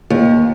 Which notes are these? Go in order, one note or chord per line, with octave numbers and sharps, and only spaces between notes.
D#2